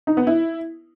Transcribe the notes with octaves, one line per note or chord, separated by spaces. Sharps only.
D#4
B3
E4